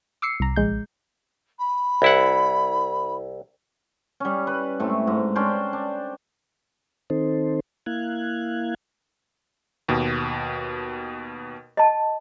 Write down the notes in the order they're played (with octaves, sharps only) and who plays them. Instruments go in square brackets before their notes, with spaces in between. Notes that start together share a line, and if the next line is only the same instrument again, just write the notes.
[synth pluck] D6 E6 C7 C#7
C2 A#5
A#1 G#3 G6
[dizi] B5
[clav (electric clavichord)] C2 E4 F#5
[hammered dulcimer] G3 C#4
B4
A2 A3 C4
G#2
C#4 D4 C5 G5
D4
[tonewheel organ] D#3 C4 D#4 A4 C5
A#3 E4 F5 F#6 G#6
[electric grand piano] D#2 B2
[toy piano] D#5 A5